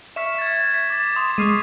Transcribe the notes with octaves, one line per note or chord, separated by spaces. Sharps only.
E5 C#6 F6 B6 E7
G#6 A6
B6
D6 A6
C6 D#6
G#3 C#6 F6 G#6 C7 D#7